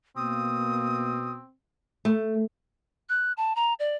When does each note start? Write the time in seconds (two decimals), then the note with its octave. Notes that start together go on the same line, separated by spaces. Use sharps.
0.17 B2 A#3 C4 D#6
2.05 A3
3.09 F#6
3.37 A5
3.56 A#5
3.79 D5